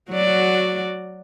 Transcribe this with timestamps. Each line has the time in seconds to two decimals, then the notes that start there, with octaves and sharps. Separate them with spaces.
0.10 F#3 F#4 D5